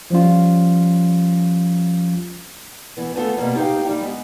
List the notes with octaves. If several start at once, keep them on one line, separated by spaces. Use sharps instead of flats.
F3 G3 C#4 F4
E3 B3
A3 B3 F4 A4
B2 G3 A#3 B3
D#4 G4 A#4 C5 F5 G5
G3 A#3 D#4
G#3 B3